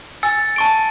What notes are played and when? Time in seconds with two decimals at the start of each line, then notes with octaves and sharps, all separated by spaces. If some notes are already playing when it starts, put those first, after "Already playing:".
0.23 G#5 E6 A6 C#7
0.56 A5 C#6 D7